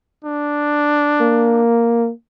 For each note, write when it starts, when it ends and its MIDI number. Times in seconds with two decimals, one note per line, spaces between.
0.25 1.64 62
1.21 2.10 58